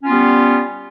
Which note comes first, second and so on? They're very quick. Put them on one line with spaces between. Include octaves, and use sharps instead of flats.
C#4 F4 B3 G3